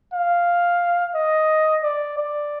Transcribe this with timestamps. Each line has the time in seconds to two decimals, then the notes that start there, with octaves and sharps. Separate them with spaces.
0.13 F5
1.15 D#5
1.83 D5
2.17 D5